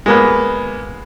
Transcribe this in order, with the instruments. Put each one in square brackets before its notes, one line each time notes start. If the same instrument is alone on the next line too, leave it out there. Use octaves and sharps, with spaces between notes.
[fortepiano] G#3 A#3 B3